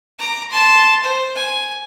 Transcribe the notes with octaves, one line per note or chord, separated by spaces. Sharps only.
A#5 D6
A5 C6
C5
G#5